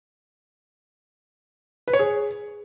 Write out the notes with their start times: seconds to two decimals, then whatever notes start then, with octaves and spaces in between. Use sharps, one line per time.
1.88 B4
1.93 C#5
1.99 G#4